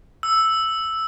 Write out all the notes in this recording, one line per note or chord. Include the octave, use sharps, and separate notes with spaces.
E6